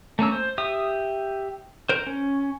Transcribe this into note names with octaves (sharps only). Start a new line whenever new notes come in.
A3 A#3 C#4 E6
C5
G4 E5 D#6
A#4 C5
C#4